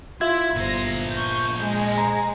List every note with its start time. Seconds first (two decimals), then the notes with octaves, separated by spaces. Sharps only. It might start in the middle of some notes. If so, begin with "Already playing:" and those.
0.21 E4 F4 E5 C6 G#6
0.56 G1 A#2 C5 A#6
1.11 C#6 G6
1.60 G#3
1.98 A#5